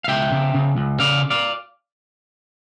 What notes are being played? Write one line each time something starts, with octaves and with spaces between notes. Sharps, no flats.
F5
C#2 E5 G5
C#3
C#3
C#2
C#3 D5 F5
D5 F5